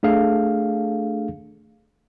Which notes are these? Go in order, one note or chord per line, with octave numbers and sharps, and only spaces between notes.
A3 D4 G#4 A4 F5